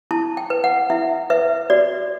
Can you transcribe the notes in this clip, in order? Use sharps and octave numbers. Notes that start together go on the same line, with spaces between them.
E4 A5
G5
B4
F#5
E4 E5
B4 E5
F#4 D5